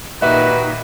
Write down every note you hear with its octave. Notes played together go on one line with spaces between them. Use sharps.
A#2 D#3 D#4 F#4 G4 B4 E5